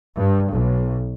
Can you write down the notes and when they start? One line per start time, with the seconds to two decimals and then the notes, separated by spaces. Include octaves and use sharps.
0.17 G2
0.50 B1